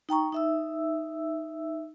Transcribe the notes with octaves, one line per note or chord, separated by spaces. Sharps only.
D#4 G5 A#5 C#6
D#4 E5 E6